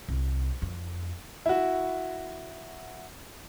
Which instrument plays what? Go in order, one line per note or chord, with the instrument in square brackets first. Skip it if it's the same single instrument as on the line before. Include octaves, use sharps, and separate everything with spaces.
[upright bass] C2
F2
[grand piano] E4 F#4